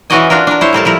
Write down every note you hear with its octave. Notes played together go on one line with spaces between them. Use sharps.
E3 C#4 F#4 D5 D#5 G#5
D4 F4 F#4 A#4
D4 A#4
E4 C5 C#5
A2 G3 A#4 A5
F3 E4 A#4